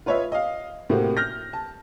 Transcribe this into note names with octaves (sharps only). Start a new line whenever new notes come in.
F4 B4 C#5 D#5 E5
D#5 F5
A2 C3 A#3 C4 F#4
F6 G6 A#6
A5